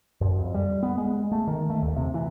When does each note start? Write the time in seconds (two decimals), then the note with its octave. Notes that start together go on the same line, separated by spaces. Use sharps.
0.21 F#2
0.39 F2
0.54 G3
0.83 B3
0.98 G#3
1.31 A3
1.47 D#3
1.70 A3
1.82 D#2
1.96 C3
2.14 E3